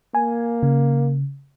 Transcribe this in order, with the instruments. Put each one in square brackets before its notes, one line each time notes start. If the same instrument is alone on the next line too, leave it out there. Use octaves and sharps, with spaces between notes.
[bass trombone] A#3 [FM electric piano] G#5
[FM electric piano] C#3